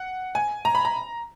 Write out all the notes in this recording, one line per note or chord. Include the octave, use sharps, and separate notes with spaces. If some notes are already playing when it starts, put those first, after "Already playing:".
Already playing: F#5
G#5
A#5
B5
A#5